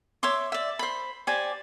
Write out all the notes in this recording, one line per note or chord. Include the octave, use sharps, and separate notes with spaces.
C#5 E5 C6 D6
D5 E5
C5 B5
G4 C5 D5 G#5